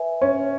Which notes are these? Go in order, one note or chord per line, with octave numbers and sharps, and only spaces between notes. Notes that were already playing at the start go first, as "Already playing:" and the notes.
Already playing: B4 E5 G#5
C#4